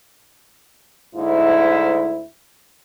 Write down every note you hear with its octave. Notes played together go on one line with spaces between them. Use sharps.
D2 G#2 E4